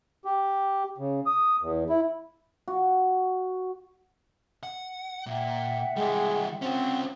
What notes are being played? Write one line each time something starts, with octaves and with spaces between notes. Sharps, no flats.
G4
C#3
D#6
E2
E4
F#4
F#5
A#2 E5 F#5 G5
E3 G3 G#3
C4 C#4 F4 F#5